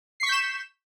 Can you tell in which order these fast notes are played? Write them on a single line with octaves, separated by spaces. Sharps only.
C7 C#6 B6 G6 E7